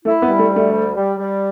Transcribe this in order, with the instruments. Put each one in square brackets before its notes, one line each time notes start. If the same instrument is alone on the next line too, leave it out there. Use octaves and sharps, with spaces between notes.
[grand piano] A3 [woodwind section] E4
[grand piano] B3
[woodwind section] G3
[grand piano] A3
[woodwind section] D2
[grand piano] A3
[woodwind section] G3
G3
G3